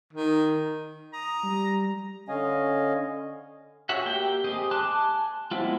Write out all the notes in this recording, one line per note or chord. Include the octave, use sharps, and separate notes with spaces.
D#3
A#5 D#6
G3
D3 C#4 D#5 F5 G#5
F#4 G#4 C#5 E5 F#5
A#3 G4 G5
C4 G4 G#4 D#5
G#5 A5 C6 D6 F#6
G#3 B3 C4 E4 F4